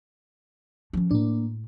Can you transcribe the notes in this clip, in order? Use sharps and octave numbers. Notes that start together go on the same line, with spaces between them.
F3 C#4
A2 A#3 D4